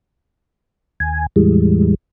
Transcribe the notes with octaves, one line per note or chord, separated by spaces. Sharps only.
D#2 G#5
E2 A2 E3 G3 G#3